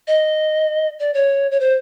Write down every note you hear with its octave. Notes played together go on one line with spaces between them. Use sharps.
D#5
D5
C#5
C#5
C5